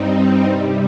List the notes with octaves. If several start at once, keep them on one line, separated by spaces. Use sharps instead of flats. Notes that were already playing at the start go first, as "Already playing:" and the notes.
Already playing: G2 G3 C4 D#4
C3 G3